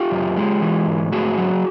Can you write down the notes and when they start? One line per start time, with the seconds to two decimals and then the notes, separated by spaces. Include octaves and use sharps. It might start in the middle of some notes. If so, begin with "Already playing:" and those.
Already playing: F4 G4
0.11 F#2
0.37 G#3
0.62 E3
0.87 G#2
1.12 A3 F#4 G#4
1.38 F#3